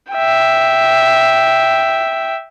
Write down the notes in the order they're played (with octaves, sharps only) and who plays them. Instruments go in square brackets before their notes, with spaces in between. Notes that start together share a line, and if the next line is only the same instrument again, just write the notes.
[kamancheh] E5 G5